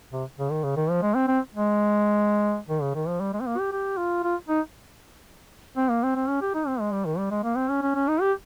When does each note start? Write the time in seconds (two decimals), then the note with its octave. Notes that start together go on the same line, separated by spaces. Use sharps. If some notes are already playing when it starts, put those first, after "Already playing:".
0.12 C3
0.39 C#3
0.51 D#3
0.64 C#3
0.77 D#3
0.90 F3
1.02 G#3
1.15 C4
1.28 C4
1.54 G#3
2.69 D#3
2.82 C#3
2.95 D#3
3.08 F3
3.20 G3
3.33 G#3
3.41 C4
3.47 A#3
3.58 G4
3.72 G4
3.97 F4
4.24 F4
4.49 D#4
5.77 C4
5.90 A#3
6.03 C4
6.16 C4
6.28 C#4
6.42 G4
6.55 D#4
6.67 C4
6.80 G#3
6.93 G3
7.05 D#3
7.18 G3
7.31 G#3
7.43 A#3
7.56 C4
7.69 C#4
7.82 C#4
7.95 C#4
8.08 D#4
8.21 G4